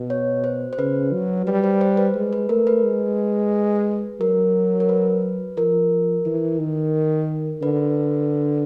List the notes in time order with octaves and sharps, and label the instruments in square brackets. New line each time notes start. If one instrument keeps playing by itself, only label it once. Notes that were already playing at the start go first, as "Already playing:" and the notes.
Already playing: [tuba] B2
[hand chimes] C#5
C5
C5
[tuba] C#3 [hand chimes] B4
[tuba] F#3
[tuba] G3 [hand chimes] B4
[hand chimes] C5
C5
B4
[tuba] G#3
[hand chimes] B4
[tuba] A3 [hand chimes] A#4
[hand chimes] B4
[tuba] G#3
[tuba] F#3 [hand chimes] A#4
[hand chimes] A#4
B4
[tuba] F3 [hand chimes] A#4
[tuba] E3
D#3
[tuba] D3 [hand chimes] B4